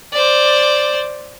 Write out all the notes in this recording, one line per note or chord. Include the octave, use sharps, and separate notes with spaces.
C5 D5